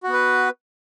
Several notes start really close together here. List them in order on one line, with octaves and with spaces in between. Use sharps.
F#4 B3 B4